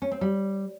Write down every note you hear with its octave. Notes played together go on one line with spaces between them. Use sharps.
C#4
C4
G3